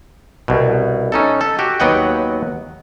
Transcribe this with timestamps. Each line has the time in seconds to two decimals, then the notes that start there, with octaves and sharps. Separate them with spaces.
0.48 C2 B2
1.12 C#4 D#4 A4
1.41 A4
1.59 F#4 G4
1.80 D#2 F#3 B3 D#5 F#5 G5